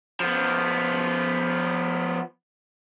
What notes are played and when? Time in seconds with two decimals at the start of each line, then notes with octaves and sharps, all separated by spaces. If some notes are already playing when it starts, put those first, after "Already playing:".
0.20 F3 B3